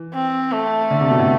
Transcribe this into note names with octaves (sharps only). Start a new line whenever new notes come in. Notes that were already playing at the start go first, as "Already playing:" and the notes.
Already playing: E3
C4
A3
D3
C3
B2
A2